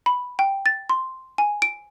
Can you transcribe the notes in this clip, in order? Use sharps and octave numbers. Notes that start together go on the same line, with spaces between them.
B5
G5
A6
C6
G#5
D7